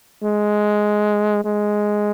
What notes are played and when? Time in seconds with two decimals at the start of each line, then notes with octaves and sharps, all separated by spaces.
0.23 G#3
1.44 G#3